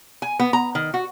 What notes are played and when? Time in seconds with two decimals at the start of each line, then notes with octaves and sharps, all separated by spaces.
0.22 G#5
0.40 B3
0.53 A#5
0.75 D#3
0.94 F#4